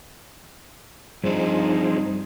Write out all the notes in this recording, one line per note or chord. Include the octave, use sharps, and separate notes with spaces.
G2 F3 G3 C4 D4 D#4 G#4 C5